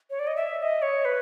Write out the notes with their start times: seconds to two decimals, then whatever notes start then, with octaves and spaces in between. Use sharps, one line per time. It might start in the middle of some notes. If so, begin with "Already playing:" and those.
0.10 C#5
0.19 D5
0.27 D#5
0.36 E5
0.59 E5
0.62 D#5
0.82 C#5
1.05 B4